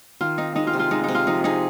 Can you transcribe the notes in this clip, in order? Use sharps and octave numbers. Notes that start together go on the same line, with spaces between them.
D#3 F4
C4 D#4
G#3 D#4
F4
C3
F4
G#3 D#4
C3 D#4
F4
F3 D#4
D#4 G#4